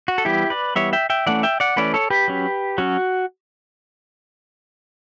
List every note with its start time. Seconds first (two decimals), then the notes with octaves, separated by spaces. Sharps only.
0.08 F#4
0.18 A4
0.25 E3 G3 B3 E4 G4
0.50 B4 D5
0.76 E3 G3 B3 C#5 E5
0.93 E5 G5
1.10 E5 G5
1.26 E3 A3 C#4 D5 F#5
1.43 E5 G5
1.60 D5 F#5
1.76 E3 A3 C#4 B4 D5
1.94 A4 C#5
2.10 G4 B4
2.28 F#3 C#4
2.78 F#3 C#4 F#4